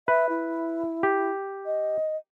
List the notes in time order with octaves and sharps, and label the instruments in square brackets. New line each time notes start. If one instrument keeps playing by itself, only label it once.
[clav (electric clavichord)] B4 [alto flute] E5
[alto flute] E4
[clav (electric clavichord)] G4
[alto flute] D#5